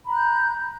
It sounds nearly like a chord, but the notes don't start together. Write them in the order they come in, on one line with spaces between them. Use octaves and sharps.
B5 A#5 F#6 G6